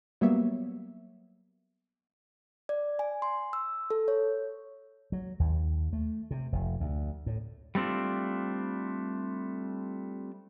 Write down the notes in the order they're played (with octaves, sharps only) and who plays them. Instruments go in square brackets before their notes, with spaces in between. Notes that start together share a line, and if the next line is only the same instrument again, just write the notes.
[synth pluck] F#3 G3 A#3 B3 C#5 E5
[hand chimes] D5
G#5
C6
E6
A4
C#5
[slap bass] F#3
D#2
A3
C3
F1
D2
A2
[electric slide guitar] G3 A3 C4 D4 F4